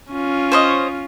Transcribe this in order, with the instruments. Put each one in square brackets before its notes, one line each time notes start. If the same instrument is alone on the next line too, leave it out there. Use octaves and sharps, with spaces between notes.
[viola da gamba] C#4 F4
[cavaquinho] C5 C#5 D#5